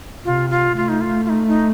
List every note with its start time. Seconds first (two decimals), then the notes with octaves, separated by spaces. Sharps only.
0.25 C3 F4
0.50 F4
0.76 A3 F4
0.89 D#4
1.01 F4
1.25 F4
1.29 D#4
1.48 D#4